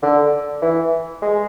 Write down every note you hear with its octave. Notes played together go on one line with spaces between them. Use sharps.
D3
E3
G#3